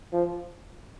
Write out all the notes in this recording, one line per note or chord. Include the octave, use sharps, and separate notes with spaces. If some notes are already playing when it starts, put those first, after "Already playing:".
F3